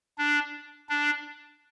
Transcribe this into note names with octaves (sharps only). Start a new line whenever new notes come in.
D4
D4